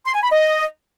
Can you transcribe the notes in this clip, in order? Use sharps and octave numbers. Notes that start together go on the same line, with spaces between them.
C6
G#5
B5
D#5